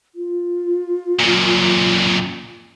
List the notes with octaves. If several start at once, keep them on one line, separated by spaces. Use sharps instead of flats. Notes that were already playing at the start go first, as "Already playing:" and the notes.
F4
F#2 A#2